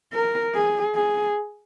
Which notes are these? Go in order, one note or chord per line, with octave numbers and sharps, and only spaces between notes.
A#4
G#4
G#4